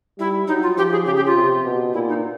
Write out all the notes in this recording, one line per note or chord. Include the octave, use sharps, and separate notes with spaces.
G3 E4
F#3 D#4
F4
F3 G4
G#4
C#3 G4
G4
F4
C3
B2
A#2 E4
D#4